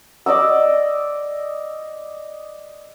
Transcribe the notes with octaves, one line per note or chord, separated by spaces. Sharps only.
D5 D#5 D6 E6